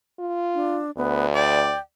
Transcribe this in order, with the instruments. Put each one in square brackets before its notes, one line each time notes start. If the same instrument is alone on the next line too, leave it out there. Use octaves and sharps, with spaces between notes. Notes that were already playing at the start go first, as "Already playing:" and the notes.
[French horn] F4
[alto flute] D4
[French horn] D2 [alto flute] B3
[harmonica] D5 [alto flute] G5